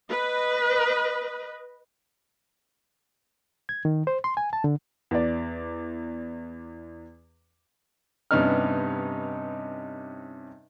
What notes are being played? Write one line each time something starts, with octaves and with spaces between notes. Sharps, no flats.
B4 D#5
G#6
D#3
C5
C6
G#5
A5
D3
E2 D5
G2 C3 B3 C#4 D#4 F6